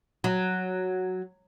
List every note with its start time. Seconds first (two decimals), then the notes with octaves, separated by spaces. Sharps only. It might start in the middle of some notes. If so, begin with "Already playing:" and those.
0.24 F#3